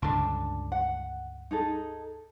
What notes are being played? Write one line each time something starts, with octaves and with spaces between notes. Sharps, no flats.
C#2 G2 D3 D4 G#4 A5
F#5
D#4 G#4 A4